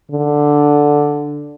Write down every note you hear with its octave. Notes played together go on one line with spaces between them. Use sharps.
D3